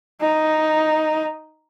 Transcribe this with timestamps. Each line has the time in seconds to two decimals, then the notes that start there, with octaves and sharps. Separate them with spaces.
0.21 D#4